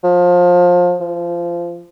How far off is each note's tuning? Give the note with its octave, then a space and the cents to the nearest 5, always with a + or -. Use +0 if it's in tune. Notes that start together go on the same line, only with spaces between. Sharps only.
F3 +25
F3 -20